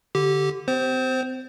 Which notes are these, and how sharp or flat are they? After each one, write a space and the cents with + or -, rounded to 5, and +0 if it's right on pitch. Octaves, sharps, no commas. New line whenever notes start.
D3 -5 G4 -15
C4 -40 C5 +0